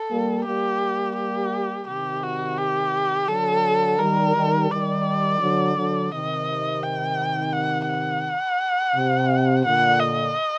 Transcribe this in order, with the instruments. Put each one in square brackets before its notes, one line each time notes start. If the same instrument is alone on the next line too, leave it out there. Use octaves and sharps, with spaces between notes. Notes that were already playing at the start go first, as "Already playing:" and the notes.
Already playing: [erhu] A4
[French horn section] G3 A#3
[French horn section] G3 A#3 [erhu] G4
[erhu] G4
[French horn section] C3 D#3 [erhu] G4
[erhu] F#4
G4
[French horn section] D3 F#3 [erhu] A4
[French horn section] D#3 G3 [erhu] A#4
[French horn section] D#3 G3
[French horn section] D#3 G3 [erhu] D5
[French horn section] D3 F#3
D3 F#3
[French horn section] C3 D#3 [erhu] D#5
[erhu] G5
F#5
F#5
[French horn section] C3
[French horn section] A#2 D3 [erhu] F#5
[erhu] D#5